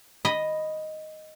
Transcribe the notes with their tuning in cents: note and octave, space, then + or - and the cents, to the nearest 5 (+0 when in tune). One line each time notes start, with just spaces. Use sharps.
D#5 +0 B5 +0